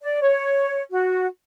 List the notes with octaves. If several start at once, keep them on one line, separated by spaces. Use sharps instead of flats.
D5
C#5
F#4